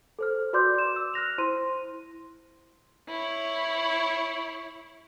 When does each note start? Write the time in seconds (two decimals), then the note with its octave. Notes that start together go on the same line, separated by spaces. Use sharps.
0.19 A4 C5 F6
0.53 F#4 B4 D5 C6 D6 G6
0.75 D6 E7
0.96 E6
1.14 F6 F#6 A#6 F7
1.38 E4 C5 C6 D#7
3.08 E4 C#5